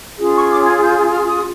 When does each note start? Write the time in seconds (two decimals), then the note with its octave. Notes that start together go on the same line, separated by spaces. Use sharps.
0.19 C#4 F4 G#4
0.36 C#6
0.51 D6
0.66 G#6
0.81 G6
1.11 F6
1.28 D#6